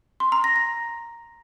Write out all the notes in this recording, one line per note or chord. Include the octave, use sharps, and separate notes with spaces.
C6
A#5
A#6
A#6